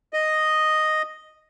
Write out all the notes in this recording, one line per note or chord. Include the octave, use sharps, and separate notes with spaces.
D#5